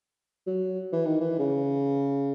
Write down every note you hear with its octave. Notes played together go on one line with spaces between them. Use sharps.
F#3
E3
D#3
E3
C#3